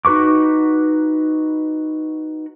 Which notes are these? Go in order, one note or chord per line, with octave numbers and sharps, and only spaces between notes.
D#4 F#4 B4 C#6 D6